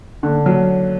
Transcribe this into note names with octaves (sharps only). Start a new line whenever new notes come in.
D3
F#3